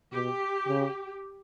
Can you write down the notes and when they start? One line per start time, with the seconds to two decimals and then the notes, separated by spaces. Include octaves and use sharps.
0.13 B2 G4
0.68 C#3